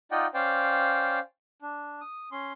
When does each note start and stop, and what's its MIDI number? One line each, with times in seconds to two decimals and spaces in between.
0.11 0.27 63
0.11 0.27 65
0.11 0.27 74
0.11 0.27 75
0.11 0.27 78
0.11 0.27 79
0.34 1.19 61
0.34 1.19 72
0.34 1.19 74
0.34 1.19 77
0.34 1.19 79
1.62 2.01 62
2.01 2.29 87
2.32 2.53 61
2.32 2.53 84